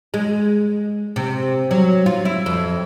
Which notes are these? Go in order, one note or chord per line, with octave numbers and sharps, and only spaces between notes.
G#3
C3
F#3
F4
E4
F2